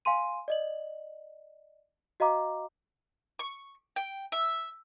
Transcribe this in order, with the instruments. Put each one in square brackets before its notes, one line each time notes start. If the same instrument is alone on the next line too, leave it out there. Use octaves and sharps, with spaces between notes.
[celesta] F5 G#5 C6 D#7
D5 D#5 F#7
F#4 D#5 F5 A#5 D6
[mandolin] C#6
G5
E5